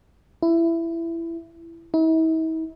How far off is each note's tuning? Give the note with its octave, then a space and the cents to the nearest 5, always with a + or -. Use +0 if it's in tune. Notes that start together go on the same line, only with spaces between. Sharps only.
E4 +15
E4 -45